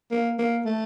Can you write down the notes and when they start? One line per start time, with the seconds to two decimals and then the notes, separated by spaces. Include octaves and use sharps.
0.11 A#3
0.39 A#3
0.65 A3